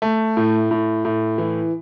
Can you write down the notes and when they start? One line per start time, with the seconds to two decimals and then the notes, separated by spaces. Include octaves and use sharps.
0.02 A3
0.37 A2
0.71 A2
1.05 A2
1.38 E3